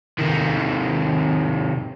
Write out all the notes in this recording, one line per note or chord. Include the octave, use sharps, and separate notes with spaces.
C3 D#3